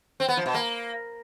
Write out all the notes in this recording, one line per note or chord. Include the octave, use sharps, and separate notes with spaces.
C4
B3
F3
B2
A#3